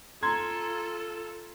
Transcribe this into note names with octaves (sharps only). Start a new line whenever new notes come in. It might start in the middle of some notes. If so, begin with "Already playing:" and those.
F4 A4 A#5 C6 G#6